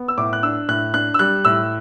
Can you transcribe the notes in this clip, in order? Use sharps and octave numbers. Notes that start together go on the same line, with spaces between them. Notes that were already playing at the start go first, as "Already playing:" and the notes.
Already playing: B3
E6
A2 D6
F#6
D4 E6
A2 F#6
D4 F#6
E6
G3 F#6
A2 E6